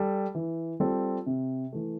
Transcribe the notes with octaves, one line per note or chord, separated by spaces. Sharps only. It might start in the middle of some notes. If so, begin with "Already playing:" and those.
Already playing: G3 A4
E3
G3 C4 F4 A4
C3
E3 A3